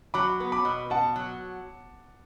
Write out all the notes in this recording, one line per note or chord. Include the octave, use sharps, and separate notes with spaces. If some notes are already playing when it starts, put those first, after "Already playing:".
F#3 B5 D6
B3
B5 D6
B2
B2 F#5 A5
F#3